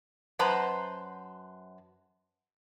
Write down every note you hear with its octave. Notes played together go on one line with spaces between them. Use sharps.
F#2 B4 C5 A5 A#5